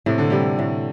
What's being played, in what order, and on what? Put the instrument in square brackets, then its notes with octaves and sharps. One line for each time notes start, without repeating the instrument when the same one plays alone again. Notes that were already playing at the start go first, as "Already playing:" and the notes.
[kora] A2 [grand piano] C3
[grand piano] D3
[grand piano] C3 [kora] G3
[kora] A2